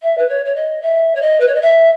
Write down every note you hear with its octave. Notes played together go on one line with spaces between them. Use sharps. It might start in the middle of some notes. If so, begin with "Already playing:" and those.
E5
B4
C#5
C#5
D#5
E5
C#5
D#5
B4
C#5
D#5
E5